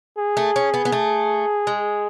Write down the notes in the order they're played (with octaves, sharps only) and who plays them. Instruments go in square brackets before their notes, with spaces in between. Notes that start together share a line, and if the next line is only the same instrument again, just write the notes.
[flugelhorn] G#4
[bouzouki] A3
C#4
B3
B3
A3
G#3